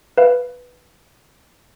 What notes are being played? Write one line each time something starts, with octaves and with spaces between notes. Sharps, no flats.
B4 F5